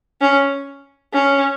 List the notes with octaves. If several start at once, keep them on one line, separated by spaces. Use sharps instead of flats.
C#4
C#4